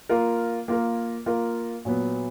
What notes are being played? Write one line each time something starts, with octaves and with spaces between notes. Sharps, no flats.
A#3 F4 A#4
A#3 F4 A#4
A#3 F4 A#4
A#2 F#3 B3